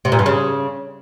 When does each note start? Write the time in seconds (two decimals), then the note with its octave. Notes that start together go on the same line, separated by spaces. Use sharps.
0.05 C3
0.12 A#2
0.19 G2
0.26 C#3